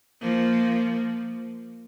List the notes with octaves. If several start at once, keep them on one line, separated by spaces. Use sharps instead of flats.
F3 A#3